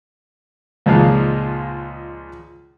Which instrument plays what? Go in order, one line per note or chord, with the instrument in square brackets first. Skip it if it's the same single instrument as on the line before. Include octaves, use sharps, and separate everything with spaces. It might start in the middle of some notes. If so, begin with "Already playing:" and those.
[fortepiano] C#2 A#2 F3 G#3 D#4 F5